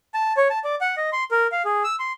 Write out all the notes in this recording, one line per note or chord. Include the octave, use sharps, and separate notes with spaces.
A5
C#5
A5
D5
F#5
D#5
C6
A#4
F5
G#4
E6
C6